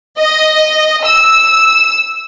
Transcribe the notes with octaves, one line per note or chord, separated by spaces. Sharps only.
D#5
E6